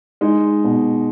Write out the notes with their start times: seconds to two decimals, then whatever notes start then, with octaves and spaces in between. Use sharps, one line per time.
0.21 G#3 D#4
0.64 B2